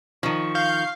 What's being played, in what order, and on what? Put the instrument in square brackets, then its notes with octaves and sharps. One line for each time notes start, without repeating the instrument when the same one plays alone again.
[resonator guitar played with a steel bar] D#3 F3 [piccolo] C#6
[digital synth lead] F5 [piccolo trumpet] G6